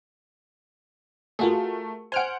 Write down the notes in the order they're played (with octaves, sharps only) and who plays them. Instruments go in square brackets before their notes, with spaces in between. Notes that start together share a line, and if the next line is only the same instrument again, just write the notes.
[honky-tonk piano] A3 A#4 [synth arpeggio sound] F4 F#4 G#4
[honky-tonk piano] C5 F#5 [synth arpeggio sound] G#5 F6 D7